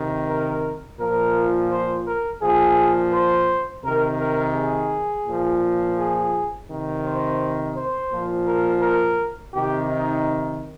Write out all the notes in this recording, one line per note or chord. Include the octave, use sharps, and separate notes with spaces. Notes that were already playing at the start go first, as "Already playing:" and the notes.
Already playing: C3 D#3
A#4
A#2 F3 A#4
C5
A#4
A#2 F3 G#4
C5
C3 D#3 A#4
A#4
G#4
A#2 F3
G#4
C3 D#3
C5
C5
A#2 F3
A#4
A#4
C3 D#3 G4
D#4